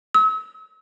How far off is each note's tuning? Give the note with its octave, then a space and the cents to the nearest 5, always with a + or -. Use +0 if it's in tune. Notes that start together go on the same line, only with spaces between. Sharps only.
E6 -40